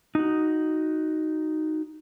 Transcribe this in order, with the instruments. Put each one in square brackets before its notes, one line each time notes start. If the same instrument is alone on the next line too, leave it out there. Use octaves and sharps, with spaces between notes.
[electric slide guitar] D#4 F#4